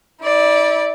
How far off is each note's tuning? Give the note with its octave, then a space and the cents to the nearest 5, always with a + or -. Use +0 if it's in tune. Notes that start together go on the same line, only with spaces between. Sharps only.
E4 -35 D5 +0